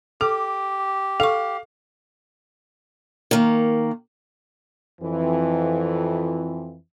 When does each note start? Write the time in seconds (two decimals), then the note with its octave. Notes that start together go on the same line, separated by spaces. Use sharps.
0.21 G4 A4 D6
1.20 A4 F5 C#6
3.31 D#3 A#3
5.01 F2 E3